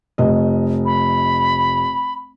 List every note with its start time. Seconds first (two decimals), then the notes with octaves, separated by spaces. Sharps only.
0.18 F1 D#5
0.85 B5